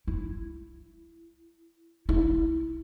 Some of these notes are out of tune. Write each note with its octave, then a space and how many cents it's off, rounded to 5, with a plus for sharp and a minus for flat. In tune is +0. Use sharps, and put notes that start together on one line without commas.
E4 +15
E4 -15